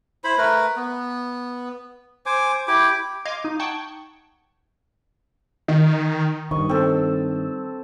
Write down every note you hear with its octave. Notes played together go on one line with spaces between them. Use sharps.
E4 C5 B5
A3 A#4 B4
B3
C5 G#5 D6
E4 G4 D6
D#5 F5 C6 D6 G#6
D#4
F#5 G5 A5 C#6 G#6
D#3
G2 D#3 D#5 C#6
C4 A4